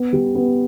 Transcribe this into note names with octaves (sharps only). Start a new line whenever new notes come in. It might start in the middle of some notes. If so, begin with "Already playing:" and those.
Already playing: B3
G3
B3